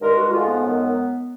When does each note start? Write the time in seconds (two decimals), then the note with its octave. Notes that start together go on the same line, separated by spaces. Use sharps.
0.01 G2 D#3 G#3 A#4
0.17 F#4
0.31 G#2 F3 A3 F4
0.47 B3
0.62 F#2 D#3 G#3